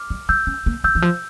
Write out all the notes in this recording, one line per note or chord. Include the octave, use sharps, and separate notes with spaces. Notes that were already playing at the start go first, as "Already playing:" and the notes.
Already playing: D6 F6
G3
G3 E6 G6
C#4
A#3
A3 E6 G6
E3
F3